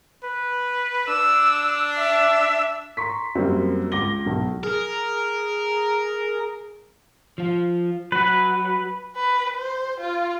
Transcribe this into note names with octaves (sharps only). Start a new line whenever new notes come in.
B4
D4 E6
E5
A#5 C6 C#6 B6
F#2 F#3 G3 A#3 C4
C#2 D6 A#6 G7
B1
G#4 A#4
F3 F4
F#3 F#4 B4
B4
C5
F4